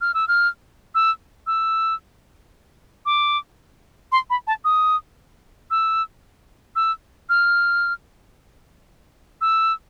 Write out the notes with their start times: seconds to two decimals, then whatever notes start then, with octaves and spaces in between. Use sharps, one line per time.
0.01 F6
0.14 E6
0.28 F6
0.95 E6
1.47 E6
3.06 D6
4.12 C6
4.30 B5
4.47 A5
4.65 D#6
5.71 E6
6.76 E6
7.29 F6
9.41 E6